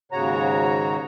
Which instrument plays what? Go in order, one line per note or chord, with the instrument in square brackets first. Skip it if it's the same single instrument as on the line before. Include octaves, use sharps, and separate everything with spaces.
[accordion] D#2 G#2 C#3 F#4 C#5 A#5